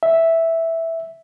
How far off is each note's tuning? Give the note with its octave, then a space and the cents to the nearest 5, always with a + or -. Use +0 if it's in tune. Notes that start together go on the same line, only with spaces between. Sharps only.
E5 -5